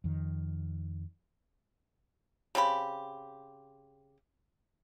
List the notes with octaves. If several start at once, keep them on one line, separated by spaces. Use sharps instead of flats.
F2 D#3
C#3 C4 G4 B5